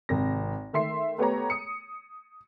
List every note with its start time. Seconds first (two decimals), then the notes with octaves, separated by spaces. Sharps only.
0.09 G#1 C3 A#6
0.73 D#3 A3 E5 C6 C7
1.18 A3 B3 G4 C#5 A#5
1.50 D#6 C#7